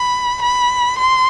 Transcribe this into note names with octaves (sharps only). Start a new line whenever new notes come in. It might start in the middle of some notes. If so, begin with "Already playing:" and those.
Already playing: B5
B5
C6